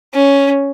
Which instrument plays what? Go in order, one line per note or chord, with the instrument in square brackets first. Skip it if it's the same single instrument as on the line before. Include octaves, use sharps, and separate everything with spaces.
[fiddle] C#4